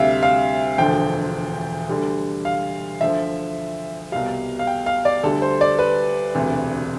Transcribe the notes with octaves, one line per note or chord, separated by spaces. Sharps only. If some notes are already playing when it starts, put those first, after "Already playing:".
Already playing: D2 C3 G3 E5 F5
F5
E1 D2 D3 F3 G5
D2 D3 G3
F5
D2 D3 F3 E5
C2 B2 G3 F5
F5
G5
F5
D5
D2 D3 G3 A4
C5
D5
B4
E1 D2 C3